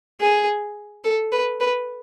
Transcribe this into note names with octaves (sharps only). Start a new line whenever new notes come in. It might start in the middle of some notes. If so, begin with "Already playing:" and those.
G#4
A4
B4
B4